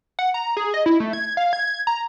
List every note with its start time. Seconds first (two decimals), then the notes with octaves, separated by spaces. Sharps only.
0.19 F#5
0.34 A#5
0.57 G#4
0.74 D#5
0.86 E4
1.00 A3
1.13 G#6
1.37 F5
1.53 G#6
1.87 A#5